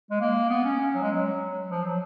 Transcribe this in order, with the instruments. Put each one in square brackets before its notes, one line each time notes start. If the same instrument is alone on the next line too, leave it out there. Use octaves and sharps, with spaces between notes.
[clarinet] G#3
A#3
B3
C#4
C#4
F#3
G#3
F#3
F3
F#3